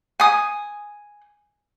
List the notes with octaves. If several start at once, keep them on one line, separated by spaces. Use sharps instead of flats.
G#5 D#6